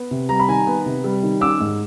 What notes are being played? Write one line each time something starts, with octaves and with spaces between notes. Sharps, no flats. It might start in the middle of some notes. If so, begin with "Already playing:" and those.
Already playing: B3
C3
G3 A#5
B5
D#3 G#5 A#5
B3
C3
G3
D#3
C#4 D6 E6
G#2